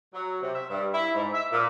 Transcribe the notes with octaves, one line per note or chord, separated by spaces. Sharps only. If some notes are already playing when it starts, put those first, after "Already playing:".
F#3
C3
E5
G2
E4
G#2
E5
A#2